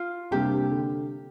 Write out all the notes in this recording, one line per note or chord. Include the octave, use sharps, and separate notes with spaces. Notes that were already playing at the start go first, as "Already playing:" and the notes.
Already playing: F4
C3 G3 A#3 D4 G4
D3